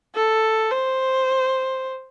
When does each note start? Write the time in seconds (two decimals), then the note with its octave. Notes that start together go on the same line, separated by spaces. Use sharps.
0.15 A4
0.71 C5